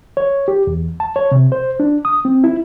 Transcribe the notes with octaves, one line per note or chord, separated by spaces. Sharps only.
C#5
G4
E2
A5
C#5
C3
C5
D4
D#6
C4
E4